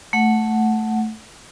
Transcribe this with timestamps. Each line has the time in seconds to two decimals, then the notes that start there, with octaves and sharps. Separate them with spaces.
0.13 A3 F#5